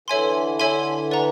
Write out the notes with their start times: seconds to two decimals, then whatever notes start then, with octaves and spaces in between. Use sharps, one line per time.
0.08 D3 E3 A4 C#5 E5 G#5 C6
0.60 A4 C#5 E5 G#5 C6
1.11 B4 D5 F#5 A#5